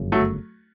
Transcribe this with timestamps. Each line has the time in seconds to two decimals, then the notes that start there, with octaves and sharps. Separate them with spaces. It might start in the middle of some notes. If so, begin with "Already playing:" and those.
Already playing: G1 F#2 C#3
0.12 F#3 A3